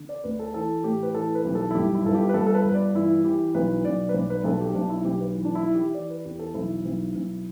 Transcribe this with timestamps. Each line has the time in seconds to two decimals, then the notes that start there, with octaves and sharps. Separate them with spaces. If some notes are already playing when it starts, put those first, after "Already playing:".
Already playing: D3
0.09 D5
0.24 D2 B4
0.39 A4
0.54 E3 A4
0.84 A2 G4
1.03 B4
1.14 E3 A4
1.35 B4
1.45 B1 G4
1.55 A4
1.71 E4
1.75 G2 G4
1.95 E4
2.04 G1 A4
2.14 G4
2.29 B4
2.34 G2 A4
2.47 A4
2.55 B4
2.65 G1 B4
2.74 D5
2.94 E3 E4
3.24 E3 G4
3.54 B1 B4
3.85 B1 D5
4.09 B4
4.14 B1 D5
4.30 B4
4.44 B1 A4
4.60 G4
4.75 B1 D4
4.90 E4
5.05 B1 G4
5.20 B4
5.35 E3
5.45 D4
5.55 E4
5.65 E3
5.75 G4
5.94 E3 D5
6.10 B4
6.25 E2 G4
6.39 A4
6.54 B1 E4
6.85 B1
7.16 B1